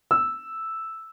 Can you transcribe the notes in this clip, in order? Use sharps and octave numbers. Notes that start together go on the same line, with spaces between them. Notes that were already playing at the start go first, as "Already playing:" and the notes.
E6